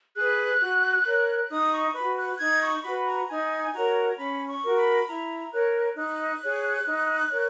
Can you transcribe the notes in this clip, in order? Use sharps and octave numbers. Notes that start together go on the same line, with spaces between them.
G#4 B4 F#6
F#4
A#4 C#5
D#4 D#6
C#6
F#4 B4 B5
F#6
D#4 G#6
C#6
F#4 B4 B5
A#5
D#4 G#5
F#4 A#4 C#5 A#5
C#4 B5
C#6
F#4 A#4
B5
E4 A#5
A#4 C#5 F#6
D#4 F#6
G#4 C#5
D#4
A#4 C#5